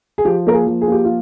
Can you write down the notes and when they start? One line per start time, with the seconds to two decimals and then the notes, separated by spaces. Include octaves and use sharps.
0.18 G#4
0.25 F3 G4
0.47 A#3 A#4
0.54 G#4
0.67 F3
0.81 G#4
0.88 A#3 G4
1.04 F4